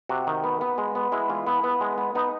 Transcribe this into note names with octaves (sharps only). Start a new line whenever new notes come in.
C3 F#4
D#3
B3
B3
G#3
B3
G#3 E4
E3 F4
B3 E4
B3
G#3
B3
B3 D#4